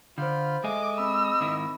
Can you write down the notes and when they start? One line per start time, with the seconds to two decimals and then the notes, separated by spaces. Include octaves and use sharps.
0.18 D3 F4 C5 B5 F6 G6
0.64 G#3 G#4 A4 D#5 E5 G#5 D6
0.97 C4 B5 D6 E6
1.41 G#2 D#3 E4